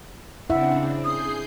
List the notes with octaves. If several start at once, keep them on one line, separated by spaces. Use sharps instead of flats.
C#3 C4 D4 E4 E5 F#5
G#4 D#6 G6 C7